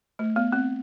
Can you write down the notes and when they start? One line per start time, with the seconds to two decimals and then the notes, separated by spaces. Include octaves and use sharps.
0.19 A3
0.36 B3
0.52 C4